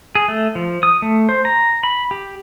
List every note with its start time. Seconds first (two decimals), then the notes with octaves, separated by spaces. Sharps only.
0.15 G#4
0.28 A3
0.55 F3
0.83 D#6
1.02 A3
1.29 C5
1.45 A#5
1.83 B5
2.11 G4